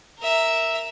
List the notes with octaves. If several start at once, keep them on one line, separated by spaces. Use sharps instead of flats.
A#4 E5